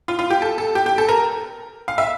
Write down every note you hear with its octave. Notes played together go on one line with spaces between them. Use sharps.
F4
F4
G4
A4
A4
G4
G4
A4
A#4
F5
E5